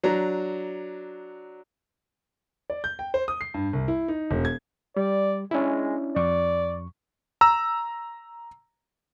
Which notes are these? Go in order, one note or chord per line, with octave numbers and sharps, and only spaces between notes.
F#3 D4 A#5
D5
G6
G5
C5
D#6
C7
G2
C2
E4
D#4
E1
G#6
G3 D5
G#3 C#4 D4 E4
F2 D5 C#6
A#5 E6